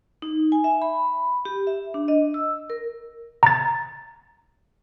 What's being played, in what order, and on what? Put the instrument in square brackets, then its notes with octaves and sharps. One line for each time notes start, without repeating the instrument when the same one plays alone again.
[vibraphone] D#4
G#5
E5
B5
G4
E5
D4
D#5
E6
A#4
[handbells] A#5 A6